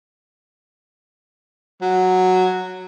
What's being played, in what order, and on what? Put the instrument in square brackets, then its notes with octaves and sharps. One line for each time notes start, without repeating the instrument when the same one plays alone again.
[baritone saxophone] F#3